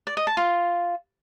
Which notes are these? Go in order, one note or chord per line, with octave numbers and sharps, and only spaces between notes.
D5
D#5
A5
F4